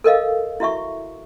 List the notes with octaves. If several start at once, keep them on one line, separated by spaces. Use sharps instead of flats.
A4 A#4 D#5 F5
E4 F#4 E5 C#6